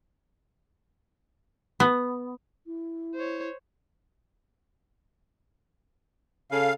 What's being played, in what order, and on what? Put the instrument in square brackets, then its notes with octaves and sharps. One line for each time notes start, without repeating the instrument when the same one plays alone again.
[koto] B3
[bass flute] E4
[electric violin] C5 C#5
[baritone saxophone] C#3 [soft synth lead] A4 [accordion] F5